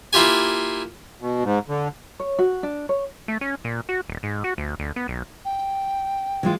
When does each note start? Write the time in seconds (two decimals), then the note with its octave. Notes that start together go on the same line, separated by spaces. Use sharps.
0.13 A#3 E4 F4 G4 G#5
1.21 B2
1.44 G#2
1.68 D3
2.20 C#5
2.39 F#4
2.63 D4
2.89 C#5
3.28 A3
3.41 C#4
3.64 A#2
3.89 F#4
4.08 D#1
4.23 G#2
4.44 F#4
4.58 D2
4.79 D2
4.96 B3
5.08 B1
5.45 G5
6.43 E3 G#3 F4